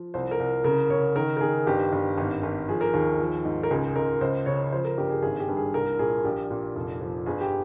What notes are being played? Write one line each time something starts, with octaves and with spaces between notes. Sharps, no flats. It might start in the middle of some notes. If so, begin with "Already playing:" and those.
Already playing: F3
C2 C5
A#4
C2
C#3 A#4
C#3 C#5
D#3 A#4
A#4
D#3 G#4
G1 G4
G1
G#1
G#1
F3 G#4
A#4
D#2 G#4
F3
G#2
A#4
C#2 G#4
C#2 A#4
C#2 C5
C#3 C#5
F3 C5
A#4
G1 G4
G#4
G#1 G#4
G4
G2
G#4
C2 A#4
A#2 G#4
A#1 G4
A#2
F1
F3
G1 G#4
G4